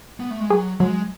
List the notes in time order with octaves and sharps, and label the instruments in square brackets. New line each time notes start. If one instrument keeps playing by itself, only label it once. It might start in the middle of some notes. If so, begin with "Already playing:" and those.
[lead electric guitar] B3
A3
G#3
[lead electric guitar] F#3 [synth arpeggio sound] G#4
[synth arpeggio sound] F#3 [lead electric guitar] G#3